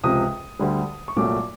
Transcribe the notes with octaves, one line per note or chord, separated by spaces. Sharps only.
C#2 C3 F3 D#6
D2 D3 G3
C#6
C2 A#2 F#3 A3 D6